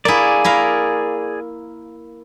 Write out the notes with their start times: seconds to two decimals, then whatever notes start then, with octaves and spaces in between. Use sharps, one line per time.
0.05 A#3 E4 G#4 D5
0.44 E4 A#4 F5